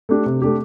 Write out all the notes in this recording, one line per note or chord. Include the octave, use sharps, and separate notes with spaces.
A3 D4 G4
C3
A3 D4 G4